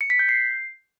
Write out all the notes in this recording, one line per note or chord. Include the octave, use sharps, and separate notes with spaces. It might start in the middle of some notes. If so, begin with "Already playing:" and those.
C#7
B6
G6
C7